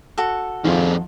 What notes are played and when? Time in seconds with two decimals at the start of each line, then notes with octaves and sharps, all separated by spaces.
0.18 F#4 A4
0.64 F2 D#3 F3 F4 G#4